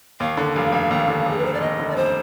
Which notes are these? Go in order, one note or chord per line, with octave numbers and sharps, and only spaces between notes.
D#2 F5
D3
F1
F1
D#2
D3
F1
G#4
B4
F1 C5
D5
D#2 D#5
D3
D5
F1 C5